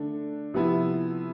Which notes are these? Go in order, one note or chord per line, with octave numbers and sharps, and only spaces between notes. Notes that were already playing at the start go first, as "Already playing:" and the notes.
Already playing: D3 A3 D4
C3 F3 B3 E4